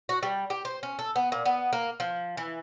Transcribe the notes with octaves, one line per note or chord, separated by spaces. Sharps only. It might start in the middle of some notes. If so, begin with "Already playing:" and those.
F#4
G3
G4
C5
C#4
A4
B3
A#2
B3
A#3
F3
E3